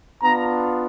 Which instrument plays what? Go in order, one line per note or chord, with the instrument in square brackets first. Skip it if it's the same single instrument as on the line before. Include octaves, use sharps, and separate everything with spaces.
[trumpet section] B3 D4 F4 A#5